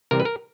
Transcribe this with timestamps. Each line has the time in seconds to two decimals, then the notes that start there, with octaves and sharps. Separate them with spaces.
0.11 C3 E3 G3 C4 A#4
0.20 B4
0.25 A#4